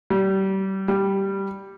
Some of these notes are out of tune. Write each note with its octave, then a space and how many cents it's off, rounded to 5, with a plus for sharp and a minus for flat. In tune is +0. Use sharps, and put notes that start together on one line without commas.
G3 -30
G3 -5